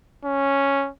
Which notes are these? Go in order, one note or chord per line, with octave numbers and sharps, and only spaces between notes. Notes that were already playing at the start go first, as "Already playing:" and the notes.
C#4